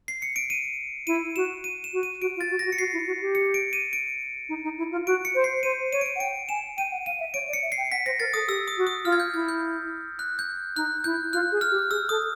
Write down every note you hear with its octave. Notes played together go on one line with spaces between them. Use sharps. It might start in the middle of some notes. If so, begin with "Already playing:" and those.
C7
C#7
D7
D#7
E4 D#7
F#4 E7
D#7
E7
F#4
D#7
F#4 D7
F4
A6
F#4
A#6
F#4
C#7
F#4 C7
E4
F#4
G4
C#7
D7
D#7
D7
D#4
D#4
E4
F4
F#4 D7
C#7
C5
C7
C5 D#7
C#5 D#7
D7
D#7
F#5
G5 D7
G#5 E7
G5 D#7
F#5
F5 D#7
E5
C#5 D7
D5
C#7
E5
C7
G5
F#5 B6
C5 A#6
A#4 A6
A4 D#6
G4 E6
D#6
F#4
D#6
F4 F6
G#6
G6
E4 G#6
G6
F#6
G6
D#4 F#6
E4 G6
F4 F#6
G#4
F6
G4
G#4 E6
A4 D#6